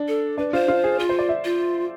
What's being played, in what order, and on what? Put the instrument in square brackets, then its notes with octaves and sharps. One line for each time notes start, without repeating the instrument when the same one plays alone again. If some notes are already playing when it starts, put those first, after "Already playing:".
Already playing: [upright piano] D4
[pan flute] A4
[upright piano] D4 [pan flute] B4
[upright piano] F4 [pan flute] C5
[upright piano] F4
G#4
[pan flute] F4
[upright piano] C5
D5
E5
[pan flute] F4